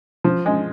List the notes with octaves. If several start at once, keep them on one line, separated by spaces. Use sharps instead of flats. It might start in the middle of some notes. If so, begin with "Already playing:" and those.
F3
G#3